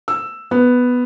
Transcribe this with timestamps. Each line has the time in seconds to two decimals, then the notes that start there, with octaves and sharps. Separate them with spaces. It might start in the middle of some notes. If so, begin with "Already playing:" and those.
0.08 E6
0.51 B3